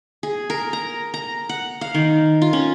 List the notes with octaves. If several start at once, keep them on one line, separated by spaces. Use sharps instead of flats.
G#4
A#4
A#5
A#5
F#5
F5
D#3
F4
C#4